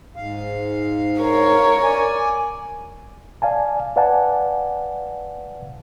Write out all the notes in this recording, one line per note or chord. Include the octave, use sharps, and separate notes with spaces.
G#2 F5
A#4 C#5
D5 G#5
D5 F5 G#5 A5
B4 D5 F5 F#5 G#5 A5